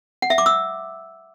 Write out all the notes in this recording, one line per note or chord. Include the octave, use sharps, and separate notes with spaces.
F#5
E5
D6
E6